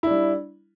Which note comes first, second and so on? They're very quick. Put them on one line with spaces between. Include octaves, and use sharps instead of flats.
E4 D4 G3